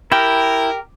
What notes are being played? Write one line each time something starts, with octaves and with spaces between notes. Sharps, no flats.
E4 G4 A#4 G5